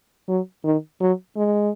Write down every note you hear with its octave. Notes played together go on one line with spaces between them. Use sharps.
F#3
D#3
F#3
G#3